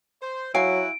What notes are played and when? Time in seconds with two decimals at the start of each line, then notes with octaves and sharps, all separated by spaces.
0.22 C5
0.55 F#3 E4 F#4 F5 G#5 D7